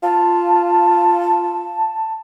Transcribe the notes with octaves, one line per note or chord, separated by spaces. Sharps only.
F4 A5